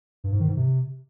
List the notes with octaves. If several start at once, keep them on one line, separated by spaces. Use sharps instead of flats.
G2
G#2
D#3
G#2
C3